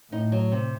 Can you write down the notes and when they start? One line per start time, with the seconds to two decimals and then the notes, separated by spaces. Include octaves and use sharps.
0.12 A2 D#4
0.32 F#3
0.52 C3